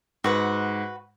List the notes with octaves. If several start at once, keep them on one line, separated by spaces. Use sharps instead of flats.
G#2 F#4 B4 F#5